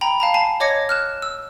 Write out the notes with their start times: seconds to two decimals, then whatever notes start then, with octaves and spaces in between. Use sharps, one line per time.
0.01 G5 A#5 B5
0.20 F5 A5 A#5
0.34 G#5 A5 C7
0.60 C#5 D#5 D6 G#6 A#6 C#7
0.89 F6 F#6 E7
1.22 E6